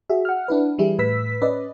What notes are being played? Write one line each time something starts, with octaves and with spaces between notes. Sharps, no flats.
F#4 G#4 E5
F#5 F6
D4 E4 B4
E3 G3 E4 G#4
A2 B4 E6 B6
C#4 B4 D5 D#5